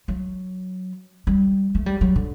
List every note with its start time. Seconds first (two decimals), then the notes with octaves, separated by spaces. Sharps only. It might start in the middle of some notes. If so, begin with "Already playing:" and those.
0.08 F#3
1.27 G3
1.75 A3
1.86 G3
2.01 F#3
2.16 D3